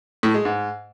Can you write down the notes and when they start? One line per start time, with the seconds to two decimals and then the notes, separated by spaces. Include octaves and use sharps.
0.23 A2
0.34 G#3
0.45 G#2